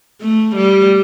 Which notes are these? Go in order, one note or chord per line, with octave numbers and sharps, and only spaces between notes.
A3
G3